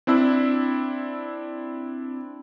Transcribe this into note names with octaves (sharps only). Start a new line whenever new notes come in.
C4 D4 E4 E6